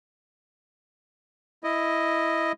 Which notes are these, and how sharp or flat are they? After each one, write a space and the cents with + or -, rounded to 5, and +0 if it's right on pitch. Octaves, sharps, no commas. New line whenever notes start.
E4 +0 D#5 +0